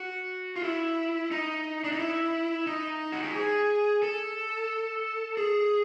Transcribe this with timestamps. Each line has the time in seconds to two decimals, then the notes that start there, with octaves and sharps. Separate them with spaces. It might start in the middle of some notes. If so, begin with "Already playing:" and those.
Already playing: F#4
0.56 F4
0.64 E4
1.31 D#4
1.84 D4
1.92 D#4
1.99 E4
2.67 D#4
3.12 F#4
3.23 G4
3.34 G#4
4.02 A4
5.37 G#4